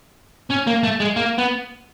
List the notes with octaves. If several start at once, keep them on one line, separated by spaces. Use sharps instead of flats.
C#4
A#3
A3
G#3
A#3
B3